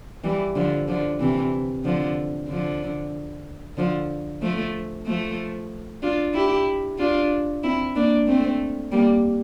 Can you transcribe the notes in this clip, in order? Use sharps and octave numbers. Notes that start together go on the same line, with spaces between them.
E3 G3
D3 F3
D3 F3
C3 E3
D3 F3
D3 F3
D3 F3
F3 A3
F3 A3
D4 F4
E4 G4
D4 F4
C4 E4
A#3 D4
A3 C4
G3 A#3